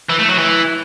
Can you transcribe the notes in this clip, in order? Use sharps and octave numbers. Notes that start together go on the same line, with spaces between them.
E3
A3
F#3
E3